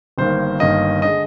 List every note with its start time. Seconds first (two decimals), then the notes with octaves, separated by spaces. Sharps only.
0.18 G1 G2 D#3 A#3 C5
0.60 G1 G2 D#3 A#3 D#5
1.02 D3 G#3 D#5